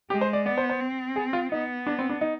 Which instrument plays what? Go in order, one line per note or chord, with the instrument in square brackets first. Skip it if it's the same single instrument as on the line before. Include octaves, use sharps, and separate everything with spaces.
[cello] G#3 [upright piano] G4
[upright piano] C5
D5
[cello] B3 [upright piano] D5
[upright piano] C5
C5
[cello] C4
[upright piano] G#4
F4
[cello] B3 [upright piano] D#4
[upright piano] D4
C4
D4
D#4